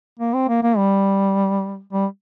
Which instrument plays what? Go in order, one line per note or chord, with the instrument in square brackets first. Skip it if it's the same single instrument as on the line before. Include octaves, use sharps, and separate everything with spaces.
[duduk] A#3
C4
A#3
A#3
G3
G3